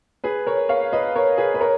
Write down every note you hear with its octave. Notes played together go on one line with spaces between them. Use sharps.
G#4 B4
A#4 C#5
C#5 F5
B4 D#5
A#4 C#5
G#4 B4
B4
A#4 C#5